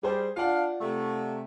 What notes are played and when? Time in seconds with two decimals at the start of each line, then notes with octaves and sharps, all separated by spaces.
0.03 G3 G#4 C5
0.37 D4 F4 D5 F5 F#5
0.80 C3 A3